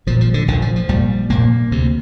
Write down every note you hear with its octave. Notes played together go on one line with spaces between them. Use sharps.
A#1 A#2 F3
F3
D3
A#1 A#2 D3
F3
F3
A#1 A#2 G3
A#1 A#2 A#3
D2 C3